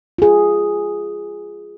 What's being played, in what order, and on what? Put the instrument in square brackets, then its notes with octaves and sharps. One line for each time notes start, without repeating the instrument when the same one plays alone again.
[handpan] F4 G#4